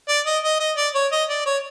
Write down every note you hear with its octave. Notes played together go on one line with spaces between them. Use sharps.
D5
D#5
D#5
D#5
D5
C#5
D#5
D5
C#5